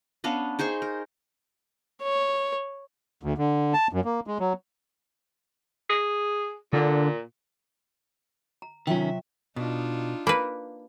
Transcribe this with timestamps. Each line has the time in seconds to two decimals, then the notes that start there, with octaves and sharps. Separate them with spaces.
0.24 B3 C#4 D4 F5
0.59 D#4 G#4 C5 C#6
0.82 A#4
2.03 C#5
3.23 D2
3.38 D3
3.74 A5
3.93 F#2
4.05 A#3
4.27 G#3
4.39 F#3
5.90 G#4
6.73 A#2 D3
8.62 A#5
8.87 C3 D#3 F#3 C#4 F4 E5 G5
9.56 B2 D4 D#4 F4
10.27 A#3 B4 B5